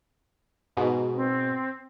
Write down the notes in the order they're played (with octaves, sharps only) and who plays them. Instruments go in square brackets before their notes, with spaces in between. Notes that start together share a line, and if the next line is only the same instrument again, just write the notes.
[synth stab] G#2 B2
[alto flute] C4